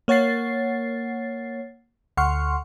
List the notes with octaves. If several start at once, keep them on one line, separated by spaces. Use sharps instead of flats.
A#3 C#5 F#5 A6 C7
D2 F#5 C6 C#6 F6